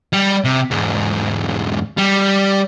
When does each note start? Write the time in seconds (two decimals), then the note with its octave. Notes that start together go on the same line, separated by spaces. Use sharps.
0.13 G3
0.45 C3
0.71 E2 G#2
1.98 G3